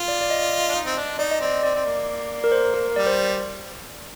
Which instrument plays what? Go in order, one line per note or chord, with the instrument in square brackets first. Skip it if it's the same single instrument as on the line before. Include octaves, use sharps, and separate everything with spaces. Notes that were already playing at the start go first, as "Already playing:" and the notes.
Already playing: [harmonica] F4
[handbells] D5
D5
D#5
[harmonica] D4
D#4
C4
D4
[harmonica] D#4 [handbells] D5
[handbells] D#5
[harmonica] C4 [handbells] D5
[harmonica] C4 [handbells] D5
[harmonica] C4
A#3
[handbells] A#4
C5
A#4
[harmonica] G3 [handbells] D5
[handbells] C5